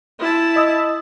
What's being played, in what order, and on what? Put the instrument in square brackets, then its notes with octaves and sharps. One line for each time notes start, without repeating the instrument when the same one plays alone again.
[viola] E4 A5
[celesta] D#5 D#6 E6